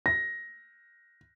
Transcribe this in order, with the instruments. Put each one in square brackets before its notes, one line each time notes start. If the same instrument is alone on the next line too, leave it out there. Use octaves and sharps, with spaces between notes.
[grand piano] A#6